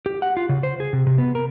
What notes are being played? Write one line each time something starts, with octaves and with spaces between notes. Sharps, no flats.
G4
F#5
F4
C#3
C5
G#4
C3
C3
B3
A#4